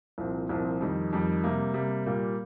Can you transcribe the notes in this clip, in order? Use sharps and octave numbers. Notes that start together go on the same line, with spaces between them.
C2 A#2 F3 C4
C2 A#2 F3 C4
F2 D#3 G3
F2 D#3 G3
C3 G3 A#3
C3 G3 A#3
A#2 G3 A#3